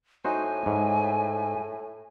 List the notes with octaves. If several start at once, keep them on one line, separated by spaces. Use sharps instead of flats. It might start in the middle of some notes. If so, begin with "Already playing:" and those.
A2 D#4 F#4 C5 G#5
G#2